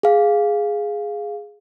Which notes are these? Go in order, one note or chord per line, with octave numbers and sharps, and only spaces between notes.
G#4 F5